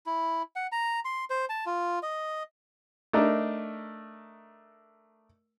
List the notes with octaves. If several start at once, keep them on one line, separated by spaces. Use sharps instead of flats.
E4
F#5
A#5
C6
C5
A5
F4
D#5
A3 D4 D#4 A#4